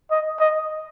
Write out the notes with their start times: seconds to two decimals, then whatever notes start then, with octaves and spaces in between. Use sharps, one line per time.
0.11 D#5
0.40 D#5